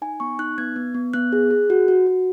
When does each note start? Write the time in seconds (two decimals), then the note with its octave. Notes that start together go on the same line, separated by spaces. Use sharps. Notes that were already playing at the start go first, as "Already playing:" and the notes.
0.02 D#4 G#5
0.20 B3 C#6
0.39 D#4 F#6
0.58 B3 G#6
0.76 B3
0.95 B3
1.13 B3 F#6
1.33 G#4
1.51 G#4
1.70 F#4
1.88 F#4
2.07 F#4